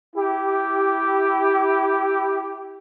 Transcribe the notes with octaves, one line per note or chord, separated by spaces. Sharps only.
E4 G4